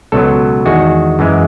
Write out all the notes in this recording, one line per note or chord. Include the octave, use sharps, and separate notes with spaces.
C#2 B2 F#3 A4
E2 D#3 G#3 F#4
F#2 E3 G#3